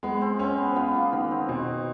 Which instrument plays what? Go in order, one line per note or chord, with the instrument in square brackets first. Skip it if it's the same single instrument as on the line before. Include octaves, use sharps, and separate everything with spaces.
[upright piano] G#3 [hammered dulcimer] B3
[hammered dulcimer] C4
[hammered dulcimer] C4 [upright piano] C#4
[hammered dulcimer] B3
[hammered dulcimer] B3 [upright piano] F4
[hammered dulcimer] A#3
[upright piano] D#3 [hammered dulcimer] B3
[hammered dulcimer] C4
[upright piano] B2 [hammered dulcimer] C4